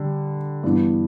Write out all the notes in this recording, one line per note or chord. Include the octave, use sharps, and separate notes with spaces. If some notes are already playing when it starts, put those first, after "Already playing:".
Already playing: D3 G3
G2 E3 B3